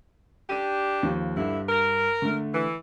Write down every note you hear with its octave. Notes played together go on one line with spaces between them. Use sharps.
D4 G4 D#7
D#2 F3
G2 D3 E4
A#4
D3 A3
E3